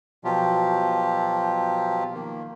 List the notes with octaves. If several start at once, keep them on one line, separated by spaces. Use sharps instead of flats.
B2 F3 F#3 F4 G4
D#3 A#3